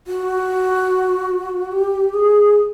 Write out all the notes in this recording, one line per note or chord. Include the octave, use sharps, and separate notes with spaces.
F#4
G4
G#4